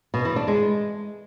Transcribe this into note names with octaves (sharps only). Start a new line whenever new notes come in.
B2
E3
D4
G#3